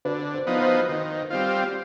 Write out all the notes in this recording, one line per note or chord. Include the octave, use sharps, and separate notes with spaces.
D3 B4
C5
F3 B3 D#4
C5
D#3 B4
G3 C4 F4